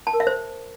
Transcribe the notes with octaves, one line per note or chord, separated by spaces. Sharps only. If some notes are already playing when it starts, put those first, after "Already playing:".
A5
A#4
E5
C5